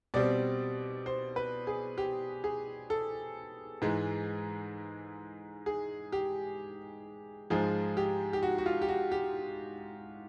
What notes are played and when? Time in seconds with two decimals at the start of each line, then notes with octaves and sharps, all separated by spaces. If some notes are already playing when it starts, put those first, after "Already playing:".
0.14 B2 G3 C4 D5
1.06 C5
1.36 B4
1.67 G#4
1.98 G4
2.44 G#4
2.90 A4
3.82 G#2 E3 G#3
5.66 G#4
6.12 G4
7.50 G#2 F3 G#3 G#4
7.97 G4
8.33 G4
8.43 F#4
8.58 F#4
8.66 F4
8.81 G4
8.88 F#4
9.12 G4